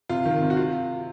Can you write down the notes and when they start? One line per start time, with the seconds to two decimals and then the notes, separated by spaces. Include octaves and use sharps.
0.09 C3 F4
0.25 D#3
0.42 C3
0.50 F#4
0.57 F4